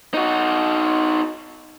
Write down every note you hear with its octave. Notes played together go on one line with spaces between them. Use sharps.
D#4 F#4